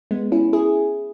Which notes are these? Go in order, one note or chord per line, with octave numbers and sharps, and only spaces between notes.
G#3 B3
C#4 E4
E4 G#4